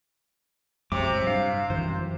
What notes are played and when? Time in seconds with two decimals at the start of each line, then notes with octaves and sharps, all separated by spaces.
0.92 F#2 C3 F#3 G#3 D6
1.12 A2 F#3
1.27 G2 F5
1.70 F#2 D#3 E3 C5